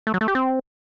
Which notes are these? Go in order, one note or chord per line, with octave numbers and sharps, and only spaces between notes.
A3
F#3
A3
G4
C4